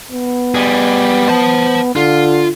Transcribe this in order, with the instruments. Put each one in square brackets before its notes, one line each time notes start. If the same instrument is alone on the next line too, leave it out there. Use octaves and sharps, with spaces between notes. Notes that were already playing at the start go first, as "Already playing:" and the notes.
[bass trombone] B3
[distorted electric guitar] G3 G#4
C5 A5
[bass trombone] D3 [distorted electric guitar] F4